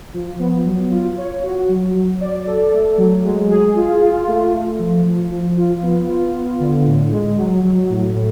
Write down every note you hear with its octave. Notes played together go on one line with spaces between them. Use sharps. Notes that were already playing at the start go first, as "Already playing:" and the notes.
F3
B3
F#3
F4
C#5
F#4
F#3
F#3
D5
A4
A3
F#3
G#3
G#4
F4
F4
A3
A3
F3
F3
F3
F4
B3
F4
B3
D3
A2
G#3
F#3
F#3
A2
A2